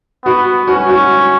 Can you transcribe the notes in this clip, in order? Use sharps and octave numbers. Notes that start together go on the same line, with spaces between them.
B3 F#4
C#4 F#4
F#4